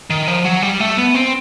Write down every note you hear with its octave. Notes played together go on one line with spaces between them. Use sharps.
D#3
F3
F#3
G3
A3
B3
C4